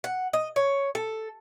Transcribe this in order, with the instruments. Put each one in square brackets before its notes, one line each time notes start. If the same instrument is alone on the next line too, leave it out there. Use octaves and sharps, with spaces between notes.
[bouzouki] F#5
D#5
C#5
A4